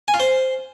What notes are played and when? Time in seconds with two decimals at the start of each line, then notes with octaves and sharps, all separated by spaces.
0.08 G#5
0.14 F4
0.20 C5